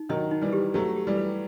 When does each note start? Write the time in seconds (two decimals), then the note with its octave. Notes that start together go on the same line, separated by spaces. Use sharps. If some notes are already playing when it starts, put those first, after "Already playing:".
Already playing: D#4
0.09 D#3 F#3 D#5
0.31 D#4
0.42 E3 G3
0.52 G4
0.74 F#3 A3 B4
0.96 G4
1.07 E3 G3
1.17 B4